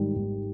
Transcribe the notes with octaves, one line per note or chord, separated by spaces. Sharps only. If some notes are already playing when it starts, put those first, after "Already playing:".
Already playing: G#1 G#2 D#3 G3
G#1